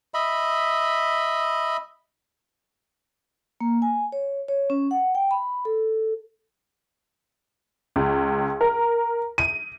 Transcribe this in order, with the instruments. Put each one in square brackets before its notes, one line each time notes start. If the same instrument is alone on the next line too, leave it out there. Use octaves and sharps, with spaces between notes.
[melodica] D#5 E5 B5
[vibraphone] A#3
G#5
C#5
C#5
C#4
F#5
G5
B5
A4
[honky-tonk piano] C#2
A#4
D#7